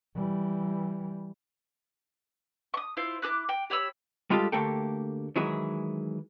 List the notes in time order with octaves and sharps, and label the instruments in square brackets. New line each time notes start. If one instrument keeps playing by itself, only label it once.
[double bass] E3 G3
[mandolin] C#6 D#6
E4 F4 C5
E4 G#4 D6 F#6
G5
G4 C#5 B5 E6
[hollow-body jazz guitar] G3 G#3 F4 G4 A4
D2 A3 A#3 G4 A4 G5
D#3 E3 F#3 G#3 E4 G#4